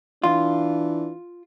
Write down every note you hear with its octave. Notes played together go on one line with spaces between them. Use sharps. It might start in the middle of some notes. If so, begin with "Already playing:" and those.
E3 D4 F4